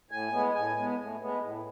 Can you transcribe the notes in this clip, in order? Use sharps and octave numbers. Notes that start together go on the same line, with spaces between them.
A2 G#5
G#3 B3
A2 G#5
G#3 B3
A2
G#3 B3
A2